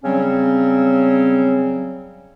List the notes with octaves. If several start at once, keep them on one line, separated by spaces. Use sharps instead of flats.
C#3 F#3 G3 C4 C#4